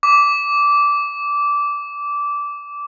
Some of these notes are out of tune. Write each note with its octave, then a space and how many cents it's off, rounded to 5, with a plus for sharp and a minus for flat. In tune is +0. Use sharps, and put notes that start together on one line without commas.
D6 -15